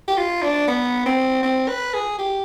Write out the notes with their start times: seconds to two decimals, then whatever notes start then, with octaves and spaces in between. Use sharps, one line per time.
0.08 G4
0.17 F4
0.42 D4
0.68 B3
1.06 C4
1.43 C4
1.69 B4
1.94 G#4
2.19 G4